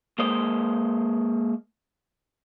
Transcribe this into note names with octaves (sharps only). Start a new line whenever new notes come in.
G#3 A#3 C5 D#5